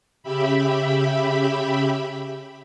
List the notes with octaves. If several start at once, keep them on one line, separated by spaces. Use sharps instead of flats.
C#3 G4 E5 B5